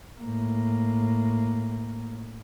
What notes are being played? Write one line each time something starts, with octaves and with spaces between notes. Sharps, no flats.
A2 A#3